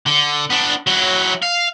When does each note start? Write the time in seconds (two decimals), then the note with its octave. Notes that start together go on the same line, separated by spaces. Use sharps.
0.06 D3
0.50 B3 D4
0.87 F#3 E4
1.42 F5